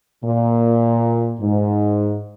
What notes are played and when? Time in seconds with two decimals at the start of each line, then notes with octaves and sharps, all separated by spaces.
0.25 A#2
1.41 G#2